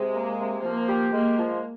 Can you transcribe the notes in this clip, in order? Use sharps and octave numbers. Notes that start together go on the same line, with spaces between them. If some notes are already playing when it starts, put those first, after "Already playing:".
Already playing: C3 G#3
A#3
C3
F3 A#3
G4
G#3 A#3
F3